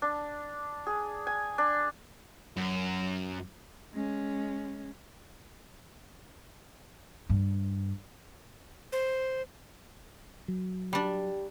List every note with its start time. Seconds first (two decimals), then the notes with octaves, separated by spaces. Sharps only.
0.02 D4
0.87 G#4
1.27 G#5
1.58 D4
2.57 F#2
3.93 G#3 C#4
7.30 G2
8.92 C5
10.48 F#3
10.93 G3 D4 G4